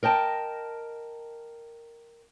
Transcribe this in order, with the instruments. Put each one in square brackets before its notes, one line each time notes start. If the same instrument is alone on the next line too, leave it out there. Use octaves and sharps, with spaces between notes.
[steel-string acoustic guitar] A#4 D#5 G5 A5